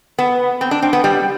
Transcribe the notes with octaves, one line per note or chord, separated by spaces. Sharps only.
B3
C4
D4
C4
B3
G3